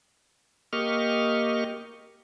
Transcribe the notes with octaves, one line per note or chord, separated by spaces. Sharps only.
A#3 G4 D#5 C#6 F6